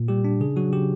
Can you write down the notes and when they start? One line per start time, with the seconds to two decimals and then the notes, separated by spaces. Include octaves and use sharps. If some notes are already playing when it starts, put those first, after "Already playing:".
Already playing: A#2
0.08 G3 G4
0.25 D4
0.40 C#3 G#4
0.56 F#3 F#4
0.72 C#3 G4